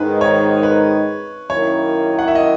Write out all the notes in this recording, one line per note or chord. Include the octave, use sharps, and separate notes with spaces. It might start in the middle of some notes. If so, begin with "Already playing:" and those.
Already playing: G#2 D#3 G#3 D#4 B4
C#5
B4
F#2 D#3 A#3 C#4 E4 C#5
F#5
E5
D#5